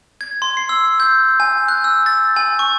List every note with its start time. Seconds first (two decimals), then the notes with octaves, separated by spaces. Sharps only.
0.21 G#6
0.42 C6
0.57 C7
0.69 E6
1.00 G6
1.40 G#5
1.68 F#6
1.84 E6
2.06 A6
2.36 G#5
2.59 C#6